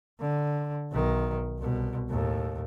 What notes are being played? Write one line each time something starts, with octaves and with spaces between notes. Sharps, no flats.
D3
B1 D#3
C2 B2
D#2 A2